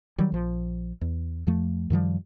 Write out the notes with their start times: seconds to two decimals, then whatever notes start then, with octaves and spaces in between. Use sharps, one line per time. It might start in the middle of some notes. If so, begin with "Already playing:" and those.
0.18 D#3 F#3 G3
0.32 A#1 F3
1.01 E2
1.47 F2 F3 A3
1.90 F#2 D#3 F3 G3